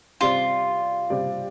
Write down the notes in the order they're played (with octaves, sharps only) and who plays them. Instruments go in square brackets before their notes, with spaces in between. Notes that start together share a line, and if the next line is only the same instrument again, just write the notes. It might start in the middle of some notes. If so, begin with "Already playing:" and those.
[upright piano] C3 G3 C4 G4 D5 [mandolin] F4
[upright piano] C3 G3 C4 G4 D5